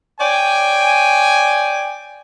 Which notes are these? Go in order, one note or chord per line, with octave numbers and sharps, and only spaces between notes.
C#5 D5 G5 G#5